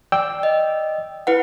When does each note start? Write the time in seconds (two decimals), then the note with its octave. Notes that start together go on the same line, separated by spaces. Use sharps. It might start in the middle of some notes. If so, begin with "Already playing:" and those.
0.12 D5 G5 E6
0.43 D#5
1.27 E4 B4 F#5